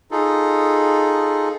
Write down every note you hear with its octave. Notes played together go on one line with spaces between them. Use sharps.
D#4 F4 G#4 A4